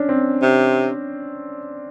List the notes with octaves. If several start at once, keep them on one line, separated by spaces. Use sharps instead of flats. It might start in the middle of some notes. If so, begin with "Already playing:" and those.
Already playing: C#4 D4
C4
C3